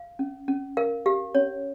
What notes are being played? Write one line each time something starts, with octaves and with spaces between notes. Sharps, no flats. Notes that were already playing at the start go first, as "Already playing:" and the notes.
Already playing: F5
C#4
C#4
A#4 F5
G4 F5
C#4 C#5